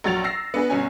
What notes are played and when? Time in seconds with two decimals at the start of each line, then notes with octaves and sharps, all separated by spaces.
0.04 A#1 F#3 A6 F7
0.24 E6 A#6 C7
0.54 B3 D4 G#4 B4
0.70 G1 B2 C#4 G#5